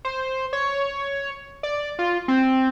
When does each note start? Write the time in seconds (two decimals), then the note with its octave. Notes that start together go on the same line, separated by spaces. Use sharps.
0.05 C5
0.53 C#5
1.63 D5
1.99 F4
2.28 C4